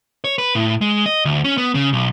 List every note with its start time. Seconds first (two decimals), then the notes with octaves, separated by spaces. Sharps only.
0.24 C#5
0.38 B4
0.55 A2
0.81 G#3
1.06 D#5
1.25 D2
1.44 C#4
1.58 B3
1.75 C#3
1.93 B1